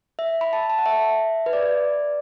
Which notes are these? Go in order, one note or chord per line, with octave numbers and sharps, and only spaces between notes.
E5
B5
A5
A5
F#5
E5
B4
D5